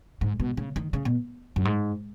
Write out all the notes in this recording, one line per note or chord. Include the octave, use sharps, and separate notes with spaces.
G#2
B2
C#3
D#3
C#3
B2
F#2
G#2